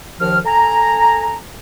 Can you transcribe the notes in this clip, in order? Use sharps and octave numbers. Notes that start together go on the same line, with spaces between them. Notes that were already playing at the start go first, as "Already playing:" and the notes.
D#2 D#3 F3 F6
A4 G#5 A#5